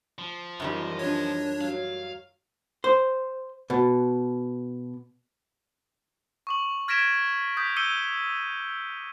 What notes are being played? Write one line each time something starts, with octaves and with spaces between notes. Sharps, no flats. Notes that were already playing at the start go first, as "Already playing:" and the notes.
F3
F#2 D#3 E3 G3 F4 D#5
D4 C#5
F#3 F5
C5
B2
C#6 D6 F#7
F6 G#6 A#6 B6 D7 E7
D#6 G6 B6
D6 E6 G6 C#7 D#7 G7